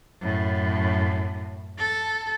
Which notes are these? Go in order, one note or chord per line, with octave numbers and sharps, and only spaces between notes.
F#2 A2
A4